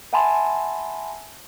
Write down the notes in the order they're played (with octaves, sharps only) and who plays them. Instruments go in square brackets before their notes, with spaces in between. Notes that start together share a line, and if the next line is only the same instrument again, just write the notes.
[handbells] E5 F#5 G#5 A5 B5 C6